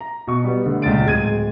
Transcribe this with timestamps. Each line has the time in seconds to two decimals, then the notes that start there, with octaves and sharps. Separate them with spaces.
0.01 A#5
0.27 B2 C#6
0.44 G3 B3
0.66 D3 A3
0.82 C#2 A#2 A6 D7
1.05 D1 G#3 G#6 D#7